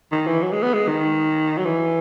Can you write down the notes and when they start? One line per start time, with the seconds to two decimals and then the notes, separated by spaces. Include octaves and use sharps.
0.12 D#3
0.27 E3
0.42 F#3
0.52 G#3
0.63 B3
0.74 G#3
0.88 D#3
1.58 F#3
1.65 E3